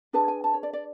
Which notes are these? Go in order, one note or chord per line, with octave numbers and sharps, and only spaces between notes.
D4 G#4 B4 A5
G#5
A5
C#5
D5
D5